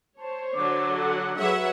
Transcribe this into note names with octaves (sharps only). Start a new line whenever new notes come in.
C5 C#5 A5
D3 F#3 D6
A4 F#5
F#3 G#4 B4 C#5 E5 F#5